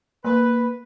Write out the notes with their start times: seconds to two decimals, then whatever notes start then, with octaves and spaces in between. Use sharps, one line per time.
0.25 A#3 B4